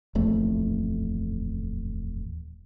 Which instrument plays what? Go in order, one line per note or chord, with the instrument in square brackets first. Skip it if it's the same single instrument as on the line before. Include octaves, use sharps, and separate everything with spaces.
[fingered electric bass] D#1 A1 F2 A3